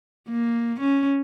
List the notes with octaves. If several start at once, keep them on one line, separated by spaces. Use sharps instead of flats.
A#3
C#4